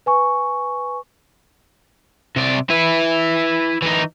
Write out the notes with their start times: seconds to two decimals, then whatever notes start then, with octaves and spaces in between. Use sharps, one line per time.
0.06 B4 G#5 C#6
2.36 C3 D5
2.70 E4 B4
3.82 E3 D#4